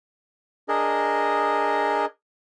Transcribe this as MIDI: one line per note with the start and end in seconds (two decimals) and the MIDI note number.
0.68 2.05 62
0.68 2.05 68
0.68 2.05 70
0.68 2.05 75